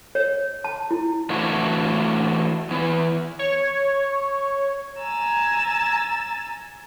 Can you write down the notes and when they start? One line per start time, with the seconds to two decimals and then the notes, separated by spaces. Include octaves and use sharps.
0.15 C#5
0.64 A5
0.91 E4
1.30 E3 A3 D4 E4 F#4
2.71 E3 B3
3.39 C#5
5.01 G#5 A#5 E6 A6